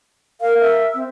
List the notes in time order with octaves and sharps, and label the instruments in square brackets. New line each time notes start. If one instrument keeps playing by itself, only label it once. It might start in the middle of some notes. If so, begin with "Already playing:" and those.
[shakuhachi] A#4 [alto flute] F5
[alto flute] E5
[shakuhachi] C4